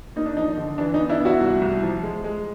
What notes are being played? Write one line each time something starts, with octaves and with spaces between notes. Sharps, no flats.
A#3 D#4
D4
F3 D#4
D3
E3 D4
D#4
B3
D4 E4
B3
E4 F#4
C2
C2
F3
G#3
G#3